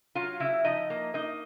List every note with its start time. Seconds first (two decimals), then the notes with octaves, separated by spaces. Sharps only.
0.15 F#3 F4 F5
0.40 C#3 E4 E5
0.64 F3 D#4 D#5
0.90 A#3
1.14 A#3 D#4 D#5